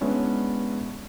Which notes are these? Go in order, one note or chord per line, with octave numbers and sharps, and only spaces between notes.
G#3 B3 C#4 D4 E4